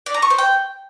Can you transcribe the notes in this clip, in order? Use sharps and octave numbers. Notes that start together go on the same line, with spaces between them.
D5
A#5
C#6
C5
G5